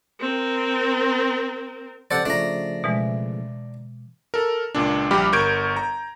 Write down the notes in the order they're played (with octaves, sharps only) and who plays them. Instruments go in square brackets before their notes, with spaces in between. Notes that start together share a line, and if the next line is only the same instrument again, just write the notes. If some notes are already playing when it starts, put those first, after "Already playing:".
[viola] C4 A#4
[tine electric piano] C3 A4 C5 [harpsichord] D5 F#5
[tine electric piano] C#3 F3 A3 [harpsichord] D4 A#5
[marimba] B2 E3 G#3
[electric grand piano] A4 A#4
C#2 A#2 D4
A#1 G3 G4 B5 D6 F6
G1 A#4 C#6 G6 G#6 D7
A#5